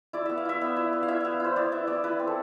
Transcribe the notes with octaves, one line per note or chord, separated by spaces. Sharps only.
E4 D5
B3 E5
F5
E4 E5
B3
E4
B3
F5
E4 E5
B3 F5
E4 C5
B3 D5
E4 E5
B3 D5
E4 B4
C4
A4